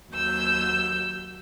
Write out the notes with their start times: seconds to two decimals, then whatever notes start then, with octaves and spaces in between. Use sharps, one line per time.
0.11 D#2 F#3 E6 G6